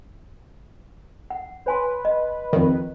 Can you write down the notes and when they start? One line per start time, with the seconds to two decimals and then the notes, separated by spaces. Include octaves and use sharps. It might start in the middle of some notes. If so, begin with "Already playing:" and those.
1.30 F#5
1.66 B4 C#5 G#5 C6
2.05 D#5
2.53 F2 D#3